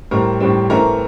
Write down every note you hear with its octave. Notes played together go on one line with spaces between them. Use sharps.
A2 G3 C4 A#4 A#5
A2 G3 C4
E3 A3 C4 A#4 A#5